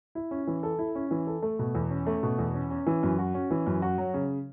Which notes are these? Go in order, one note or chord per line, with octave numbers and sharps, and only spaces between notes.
E4
C#4
E3
A4
E4
C#4
E3
A4
A3
B2
E2
C#4
A3
B2
E2
C#4
C#4
E3
F#2
F#4
C#4
E3
F#2
F#4
F#3
C#3